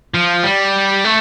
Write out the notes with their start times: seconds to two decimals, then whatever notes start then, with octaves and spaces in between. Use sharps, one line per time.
0.14 F3
0.43 G3
1.04 A3